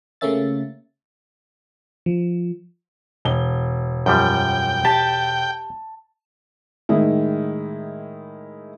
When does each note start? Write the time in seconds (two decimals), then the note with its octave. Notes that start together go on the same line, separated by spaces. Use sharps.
0.21 C#3 A3 A#3 C#4 E5 A6
2.06 F3
3.25 E1 G7
4.06 F#2 F3 G3 G5
4.85 G4 A5
6.89 A2 D#3 G#3 E4